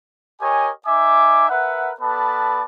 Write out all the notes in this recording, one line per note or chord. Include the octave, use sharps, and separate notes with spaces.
G4 A#4 C#5 D#5 G#5
D#4 E5 G#5 D6
A#4 B4 E5 F#5
B3 A4 B4 D5 A5 B5